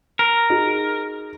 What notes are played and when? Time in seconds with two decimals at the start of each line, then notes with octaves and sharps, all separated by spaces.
0.19 A#4
0.50 D#4 F#4 G#4